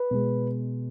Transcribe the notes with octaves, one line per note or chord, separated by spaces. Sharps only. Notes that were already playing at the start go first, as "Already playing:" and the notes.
Already playing: B4
B2 G#3